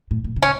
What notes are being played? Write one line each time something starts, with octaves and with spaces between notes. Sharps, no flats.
A2
A#2
C#3
C#4